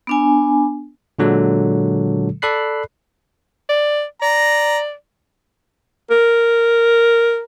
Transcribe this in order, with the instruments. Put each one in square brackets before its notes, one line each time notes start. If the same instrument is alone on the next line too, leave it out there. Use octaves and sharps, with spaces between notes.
[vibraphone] B3 D4 G#5
[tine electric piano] A#2 D3 F#3 G#3 A4
A4 D5 B5 F#6 C7
[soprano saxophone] D5
[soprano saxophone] D5 [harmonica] A#5
[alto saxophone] A#4